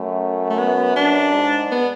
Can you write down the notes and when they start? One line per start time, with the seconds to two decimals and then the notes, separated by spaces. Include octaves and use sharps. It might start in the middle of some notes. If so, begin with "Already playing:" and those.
Already playing: F#2 A3
0.50 A3
0.58 B3
0.96 F#2 D4
1.33 G#2
1.71 B3